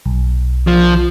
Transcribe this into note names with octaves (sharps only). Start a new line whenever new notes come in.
B1
F3